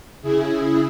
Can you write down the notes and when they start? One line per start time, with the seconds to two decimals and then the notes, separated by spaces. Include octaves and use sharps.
0.22 C#3 E4 G#4